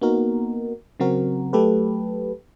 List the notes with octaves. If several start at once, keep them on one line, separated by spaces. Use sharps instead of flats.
A#3 B3 D#4 F#4 A#4
C#3 F#3 C4 F#4 A#4
F#3 A3 G4 A4 B4